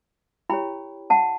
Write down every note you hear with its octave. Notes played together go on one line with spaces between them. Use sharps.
E4 G4 C#5 G5 B5
F#5 A5